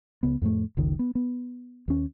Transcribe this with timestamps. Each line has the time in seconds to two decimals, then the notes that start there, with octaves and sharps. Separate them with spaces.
0.23 C#2 C#3 B3
0.42 F2 A2 G#3 A3
0.77 F#1 C#2 D#3
0.99 B3
1.15 B3
1.88 D#2 C#4